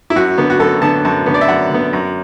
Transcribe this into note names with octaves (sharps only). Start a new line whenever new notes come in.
E4
F#2 F#4
D3 B3
F#4
F#2 A4
D3 B3 A5
F#2 A5
D3 B3
D5
E5
F#2 F#5
D3 B3
F#2